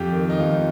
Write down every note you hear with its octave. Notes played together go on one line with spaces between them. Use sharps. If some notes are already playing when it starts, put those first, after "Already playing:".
Already playing: F2 G4
D#3
D#4
F2 F4